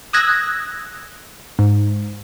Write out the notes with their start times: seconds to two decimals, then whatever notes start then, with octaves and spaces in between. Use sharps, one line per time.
0.13 D#6 E6 F#6 G#6 A#6
1.59 G#2